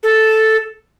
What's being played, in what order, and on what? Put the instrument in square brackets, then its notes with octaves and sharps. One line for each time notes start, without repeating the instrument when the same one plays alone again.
[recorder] A4